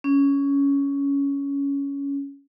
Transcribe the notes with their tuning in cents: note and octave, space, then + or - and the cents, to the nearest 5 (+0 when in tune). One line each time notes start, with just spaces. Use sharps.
C#4 +10